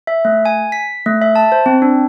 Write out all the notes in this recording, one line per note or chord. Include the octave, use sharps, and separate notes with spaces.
E5
A3
G#5
B6
A3
E5
A5
C5
C4
D4